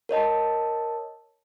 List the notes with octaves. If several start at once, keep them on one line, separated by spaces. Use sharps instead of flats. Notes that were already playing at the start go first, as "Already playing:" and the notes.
A#4 C#5 D#5 A5